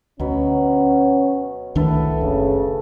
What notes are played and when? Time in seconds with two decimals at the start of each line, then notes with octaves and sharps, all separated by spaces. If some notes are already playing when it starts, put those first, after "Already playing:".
0.20 D2 B2 F#3 C#4 B5
1.75 C2 A2 D#3 D4 A4 B4
2.21 F#1 C#3